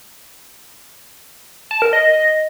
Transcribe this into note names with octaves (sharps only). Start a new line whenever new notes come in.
A5
A#4
D#5